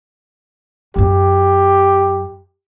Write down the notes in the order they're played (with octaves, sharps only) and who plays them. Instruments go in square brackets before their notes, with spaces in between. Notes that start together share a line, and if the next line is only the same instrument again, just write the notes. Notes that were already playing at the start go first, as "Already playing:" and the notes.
[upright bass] F#2 F#3 [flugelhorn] G4